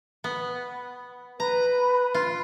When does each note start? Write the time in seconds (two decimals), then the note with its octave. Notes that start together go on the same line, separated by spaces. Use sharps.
0.24 B3
1.40 B4 A#5 B5
2.14 F4